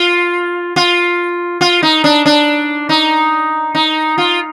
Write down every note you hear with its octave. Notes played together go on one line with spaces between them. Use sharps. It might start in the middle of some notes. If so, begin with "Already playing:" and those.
Already playing: F4
F4
F4
D#4
D4
D4
D#4
D#4
F4